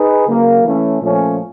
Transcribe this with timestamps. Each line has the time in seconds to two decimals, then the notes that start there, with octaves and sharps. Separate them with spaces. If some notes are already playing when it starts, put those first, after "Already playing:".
Already playing: D#4 G#4 B4
0.27 C#3 F#3 A#3
0.64 E3 A3 C#4
1.02 A#2 F3 A3 C#4